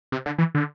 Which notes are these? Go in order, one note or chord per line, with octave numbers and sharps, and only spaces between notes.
C3
D3
E3
D3